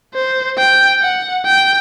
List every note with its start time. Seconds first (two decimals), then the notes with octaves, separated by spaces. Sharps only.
0.14 C5
0.58 G5
1.02 F#5
1.46 G5